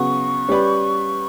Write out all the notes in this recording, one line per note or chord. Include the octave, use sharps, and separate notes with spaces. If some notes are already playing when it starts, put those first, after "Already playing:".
Already playing: C#3 F#3 B3 F#4 C#6
G3 C#4 G4 B4 D5